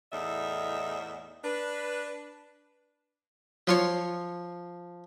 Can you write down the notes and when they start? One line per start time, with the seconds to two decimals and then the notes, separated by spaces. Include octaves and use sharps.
0.12 E2 A2 D#4 D5 E5
1.44 D4 B4
3.67 F3 F#3 F4 C#5 C6